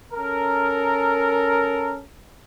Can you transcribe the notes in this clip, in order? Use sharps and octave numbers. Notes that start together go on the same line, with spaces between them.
C#4 A4 A#4